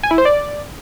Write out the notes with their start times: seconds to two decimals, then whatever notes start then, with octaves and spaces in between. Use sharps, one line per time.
0.03 G#5
0.11 E4
0.18 C5
0.25 D5